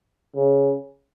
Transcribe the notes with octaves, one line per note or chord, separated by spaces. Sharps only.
C#3